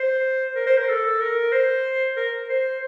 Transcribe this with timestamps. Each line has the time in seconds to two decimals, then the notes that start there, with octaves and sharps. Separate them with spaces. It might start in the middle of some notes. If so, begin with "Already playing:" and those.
Already playing: C5
0.56 A#4
0.67 C5
0.78 A#4
0.89 A4
1.20 A#4
1.52 C5
2.16 A#4
2.49 C5